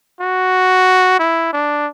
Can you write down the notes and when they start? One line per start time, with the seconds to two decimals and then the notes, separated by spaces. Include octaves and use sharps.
0.20 F#4
1.19 E4
1.53 D4